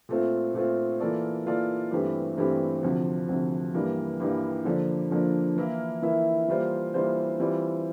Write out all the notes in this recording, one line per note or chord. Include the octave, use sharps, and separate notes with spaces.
A#2 A3 C4 F4
A#2 A3 C4 F4
E3 A#3 F4 A4 D5
E3 A#3 F4 A4 D5
G2 E3 A3 C4 G4
G2 E3 A3 C4 G4
D2 C3 F3
D2 C3 F3
G2 E3 G3 A#3
G2 E3 G3 A#3
D3 F3 A#3 D4
D3 F3 A#3 D4
E3 A#3 E4 A#4 E5
E3 A#3 E4 A#4 E5
E3 G3 A#3 F4 C5
E3 G3 A#3 F4 C5
E3 G3 C4 F4